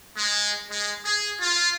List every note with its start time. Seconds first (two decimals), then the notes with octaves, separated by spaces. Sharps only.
0.17 G#3
0.70 G#3
1.04 G#4
1.39 F4